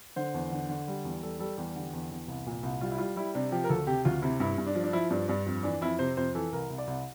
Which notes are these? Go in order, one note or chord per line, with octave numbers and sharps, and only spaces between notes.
D3 C5
E2
D3
D3
G3
E2
G3 A4
G3 A4
E2 G4
D3
E2
E2
C2
A#2
C2
G3 F4
E4
G3 F4
G3 E4
C3 D4
F3 G4
A#4
D2 A4
C3 G4
D2 F4
C3 E4
G2 E4
G2
D4
F3
D4
F3 E4
G2 D4
G2 D4
F2
E3 D4
F2 E4
C3 C5
F2 C5
E3 A4
C2 A#4
C2
D5
C2